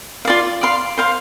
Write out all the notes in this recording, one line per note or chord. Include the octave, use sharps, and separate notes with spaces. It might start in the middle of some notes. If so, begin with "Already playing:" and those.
F4 D5 F5
D5 F5 C6
C5 F5 C6